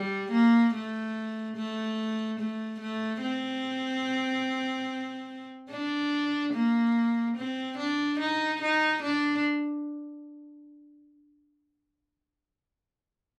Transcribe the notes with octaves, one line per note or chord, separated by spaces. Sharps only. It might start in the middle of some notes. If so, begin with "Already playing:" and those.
Already playing: G3
A#3
A3
A3
A3
A3
C4
D4
A#3
C4
D4
D#4
D#4
D4